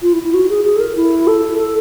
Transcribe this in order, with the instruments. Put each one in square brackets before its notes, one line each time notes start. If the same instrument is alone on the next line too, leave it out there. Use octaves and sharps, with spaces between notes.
[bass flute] F4
E4
E4
F#4
G#4
G#4
A4
A#4
E4
A4
A4